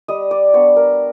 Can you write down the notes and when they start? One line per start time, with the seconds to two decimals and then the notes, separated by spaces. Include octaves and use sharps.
0.08 G3 D#5
0.31 D5
0.54 B3 D4 C#5
0.76 A#4